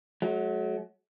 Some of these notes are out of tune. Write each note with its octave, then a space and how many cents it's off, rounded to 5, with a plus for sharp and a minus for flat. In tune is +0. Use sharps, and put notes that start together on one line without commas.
F#3 +0 A3 -45